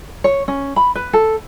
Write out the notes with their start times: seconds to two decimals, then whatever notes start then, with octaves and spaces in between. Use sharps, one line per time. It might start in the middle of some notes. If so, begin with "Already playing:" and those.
0.24 C#5
0.48 C#4
0.76 B5
0.95 B4
1.13 A4